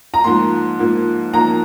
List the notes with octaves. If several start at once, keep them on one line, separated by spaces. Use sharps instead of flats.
A#5
G#2 F3 A#3 C6
G#2 F3 A#3
G#2 F3 A#3 A#5